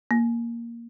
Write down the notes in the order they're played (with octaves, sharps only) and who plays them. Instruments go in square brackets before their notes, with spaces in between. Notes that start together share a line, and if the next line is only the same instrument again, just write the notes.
[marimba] A#3